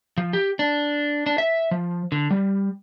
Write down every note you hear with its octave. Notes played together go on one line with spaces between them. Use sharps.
F3
G4
D4
D4
E5
F3
D3
G3